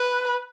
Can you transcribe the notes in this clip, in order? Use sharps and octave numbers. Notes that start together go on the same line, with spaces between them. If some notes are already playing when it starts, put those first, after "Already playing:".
Already playing: B4